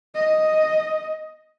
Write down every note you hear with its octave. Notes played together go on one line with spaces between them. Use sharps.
D#5